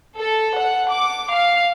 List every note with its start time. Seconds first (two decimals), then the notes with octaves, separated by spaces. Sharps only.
0.19 A4
0.60 F#5
0.92 D6
1.36 F5